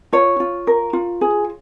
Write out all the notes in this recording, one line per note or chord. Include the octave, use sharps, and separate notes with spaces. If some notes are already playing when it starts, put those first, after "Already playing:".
F4 C#5
F4
A#4
F4
G#4